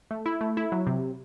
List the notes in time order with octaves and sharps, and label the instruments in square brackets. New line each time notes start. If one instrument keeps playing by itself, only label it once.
[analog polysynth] A3
E4
A3
E4
F#3
C3